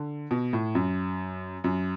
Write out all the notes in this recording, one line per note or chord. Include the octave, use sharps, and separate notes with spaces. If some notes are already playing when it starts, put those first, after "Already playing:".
Already playing: D3
B2
A2
F#2
F#2